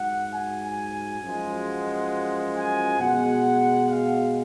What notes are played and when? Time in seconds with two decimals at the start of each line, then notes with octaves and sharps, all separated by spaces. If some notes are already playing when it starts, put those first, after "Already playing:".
Already playing: G#2 F#3 F#5
0.33 G#5
1.22 F#2 F3 G#3
1.67 F#5
2.55 G#5
2.99 B2 G#3 F#5
3.89 F5